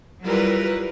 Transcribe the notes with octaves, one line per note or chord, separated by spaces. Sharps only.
F#3 G3 E4 F4 A#4 B4